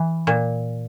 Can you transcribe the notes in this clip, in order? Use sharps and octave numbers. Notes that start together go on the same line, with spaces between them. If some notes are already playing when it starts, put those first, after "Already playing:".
Already playing: E3
A#2